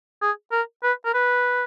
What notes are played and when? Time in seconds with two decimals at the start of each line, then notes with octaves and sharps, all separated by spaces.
0.22 G#4
0.52 A#4
0.83 B4
1.06 A#4
1.14 B4